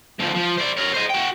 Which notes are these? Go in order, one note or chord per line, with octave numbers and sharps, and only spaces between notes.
D2 F3
F3
C5 D5
A#4 C#5
C5 D#5
F#4 G5